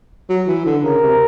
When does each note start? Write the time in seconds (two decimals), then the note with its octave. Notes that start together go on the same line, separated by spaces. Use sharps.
0.30 F#3
0.48 E3
0.65 D3
0.84 C#3 A#4
1.02 C3